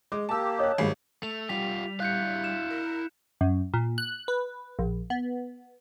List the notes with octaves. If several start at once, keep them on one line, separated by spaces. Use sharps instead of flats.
G#3 D6
A#3 G4 A5 E6
C#5 D#5 D#6 F#6
G#1 G#2 G3 F5 B5 C7
A3 F7
G3 F4 G4 B6 F7
E4 F5 F#6 G6 C#7
E7
A#4
F#2
A#2
F#6
B4
A#1
B3